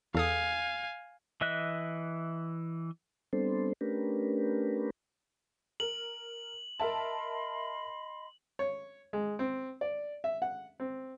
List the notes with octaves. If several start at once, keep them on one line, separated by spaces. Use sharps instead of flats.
E2 A4 F5 G#5 D#6
E3 D#5 E5 F#6
G3 B3 C4 D4 A4 C5
A3 C#4 D4 G4 A#4 B4
A#4 F#7
A#4 D#5 E5 A5 B5 C6
C#5
G#3
C4
D5
E5
F#5
C4